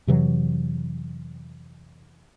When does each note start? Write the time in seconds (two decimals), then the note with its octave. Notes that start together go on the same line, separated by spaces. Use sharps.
0.07 F2 C3 E3 F#3